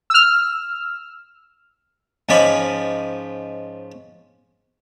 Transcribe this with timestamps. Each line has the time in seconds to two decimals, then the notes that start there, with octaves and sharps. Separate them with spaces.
0.10 E6 F6
2.29 G#2 F3 C#4 D#5 B5 D6